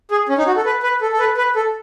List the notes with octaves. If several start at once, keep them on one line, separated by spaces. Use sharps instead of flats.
G#4
C#4
D#4
F#4
A4
B4
B4
A4
A4
B4
B4
A4